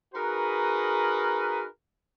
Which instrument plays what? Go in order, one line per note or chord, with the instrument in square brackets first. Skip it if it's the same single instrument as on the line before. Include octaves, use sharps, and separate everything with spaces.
[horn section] D#4 F#4 G#4 A#4 B4